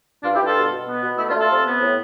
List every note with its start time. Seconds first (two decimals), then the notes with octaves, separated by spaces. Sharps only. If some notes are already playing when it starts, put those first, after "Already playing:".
0.23 G2 D4 F4
0.34 E4 G4
0.39 G2
0.45 F4 A4
0.56 B2
0.71 B2
0.87 B3
1.03 B2
1.18 A3 E4
1.29 D4 F4
1.34 A3
1.39 F4 A4
1.50 C3
1.66 B3
1.81 A2